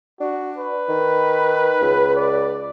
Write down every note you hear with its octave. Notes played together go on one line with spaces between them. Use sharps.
D4 F#4
B4
D#3
C#2
D5